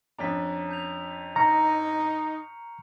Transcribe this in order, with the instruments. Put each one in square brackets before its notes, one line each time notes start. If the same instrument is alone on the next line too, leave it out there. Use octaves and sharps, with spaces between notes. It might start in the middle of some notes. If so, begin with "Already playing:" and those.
[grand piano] F2 C#4 D4 [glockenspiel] A#5 B6
[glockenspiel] A5 G6 F7
[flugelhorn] D#4 [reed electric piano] A#5 [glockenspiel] C#6 F6 C#7